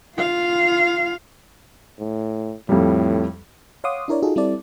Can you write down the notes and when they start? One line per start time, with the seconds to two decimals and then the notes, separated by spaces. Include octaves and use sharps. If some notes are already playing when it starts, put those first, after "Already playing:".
0.17 F4 F5
2.00 A2
2.69 F2 A2 G3
3.84 C#5 F5 F#5 C6 D6 D#6
4.08 D4 E4 A#4 C#5 D5
4.22 D#4 F4 F#4 G#4 A4
4.36 G3 C4 E4 A4 D5